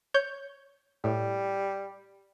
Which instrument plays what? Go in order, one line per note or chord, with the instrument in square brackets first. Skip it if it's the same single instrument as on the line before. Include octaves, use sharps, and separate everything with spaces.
[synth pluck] C#5 G6
[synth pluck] A2 [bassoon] G3